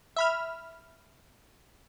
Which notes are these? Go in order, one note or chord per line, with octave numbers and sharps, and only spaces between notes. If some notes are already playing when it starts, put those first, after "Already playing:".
E5 B5 F6